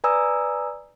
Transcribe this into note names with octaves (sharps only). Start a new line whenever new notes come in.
B4 D5 G#5 A#5 D#6 E6